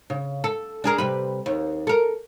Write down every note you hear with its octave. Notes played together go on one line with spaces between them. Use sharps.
C#3
A4
D4 G#4 A#4
C3 G3 B4
D#2
A4 A#4